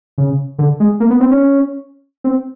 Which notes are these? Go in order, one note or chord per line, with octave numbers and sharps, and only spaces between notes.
C#3
D3
G#3
A#3
B3
C4
C#4
C4